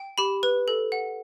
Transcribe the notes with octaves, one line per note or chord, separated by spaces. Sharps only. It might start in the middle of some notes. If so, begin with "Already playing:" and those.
Already playing: G5
G4 B5
B4
A4
F#5